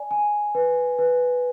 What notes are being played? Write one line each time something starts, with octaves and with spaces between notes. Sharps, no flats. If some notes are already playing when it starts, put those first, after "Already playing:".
Already playing: D5 G#5
G#5
B4
B4